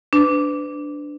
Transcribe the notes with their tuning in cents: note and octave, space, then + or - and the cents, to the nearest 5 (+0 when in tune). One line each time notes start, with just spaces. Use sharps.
D4 +0 B4 +30